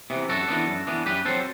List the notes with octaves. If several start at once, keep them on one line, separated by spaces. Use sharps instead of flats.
C3 E3 B3
F#2 F#4 A4
E3 B3 D4
F#2
E3 B3 D4
F#2 G4 B4
F#3 C4 A4 C5